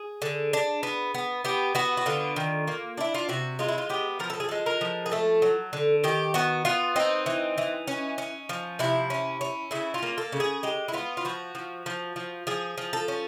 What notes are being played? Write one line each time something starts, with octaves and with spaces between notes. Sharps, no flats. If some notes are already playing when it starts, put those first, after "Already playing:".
Already playing: G#4
D3
D4
B3
B3
B3 G4
B3 F#4
F#4
D3 F4
D#3
A#3
D4 E4
F4
C3 F#4
G#3 F4
E4
F4
B3 G4
F3 A#4
A4
G#4
G#3 A4
A#4
F3
G#4
A3 A4
F#3
D3
D#3 G4
B3 F#4
B3 F4
C4 D#4
E3
E3
C#4
C#4
F3
C3 E4
C#4
C#4
C#3 E4
F4
A#3
A4
C#3
G#4
G#3 G4
E4
B3 F4
F4
F3 F#4
F3
F3
F3
F3 G#4
F3
A4
C#4